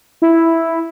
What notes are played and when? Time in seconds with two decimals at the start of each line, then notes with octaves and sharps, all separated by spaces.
0.22 E4